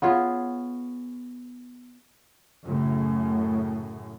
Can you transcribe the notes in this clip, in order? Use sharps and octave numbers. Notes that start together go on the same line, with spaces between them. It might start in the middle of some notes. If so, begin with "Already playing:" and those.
B3 C#4 F4 G#4
F#2 A2 C#3